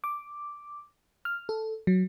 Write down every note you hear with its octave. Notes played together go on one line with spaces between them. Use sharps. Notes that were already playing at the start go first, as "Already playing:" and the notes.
D6
F6
A4
F#3